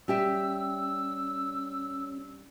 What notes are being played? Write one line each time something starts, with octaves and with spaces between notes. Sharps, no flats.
G3 C#4 G4 E5 E6